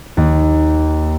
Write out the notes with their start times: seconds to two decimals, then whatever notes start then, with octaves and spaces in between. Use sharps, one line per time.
0.17 D#2